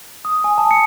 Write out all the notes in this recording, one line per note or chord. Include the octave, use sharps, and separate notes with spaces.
D#6
G#5
A5
C#7